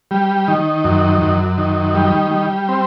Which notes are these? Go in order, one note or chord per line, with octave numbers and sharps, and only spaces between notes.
G3
D#3
F#2
F#2
D#3
G3
G3
C4